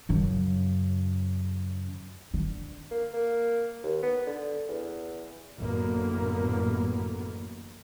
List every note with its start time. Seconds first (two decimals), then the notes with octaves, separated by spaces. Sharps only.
0.09 F#2 C#3
2.34 D3
2.91 A#3
3.13 A#3
3.83 D#2
4.02 B3
4.27 D3
4.68 E2
5.56 A1 F#2 D3 A#3 B3